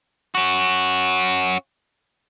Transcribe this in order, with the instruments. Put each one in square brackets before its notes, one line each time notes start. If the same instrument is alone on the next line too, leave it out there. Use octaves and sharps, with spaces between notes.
[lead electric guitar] C#4 F#4